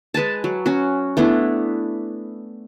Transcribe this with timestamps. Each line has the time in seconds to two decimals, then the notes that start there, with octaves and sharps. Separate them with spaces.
0.14 G#3 B4 G#5 A5
0.44 F#3
0.66 C#4 F#4
1.17 A3 B3 D4 E4